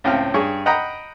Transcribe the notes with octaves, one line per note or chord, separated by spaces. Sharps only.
C#2 A2 C4 F5 F6
G2 G#4 C#5 C#6
D#5 F#5 G5 A#5 B5 D#6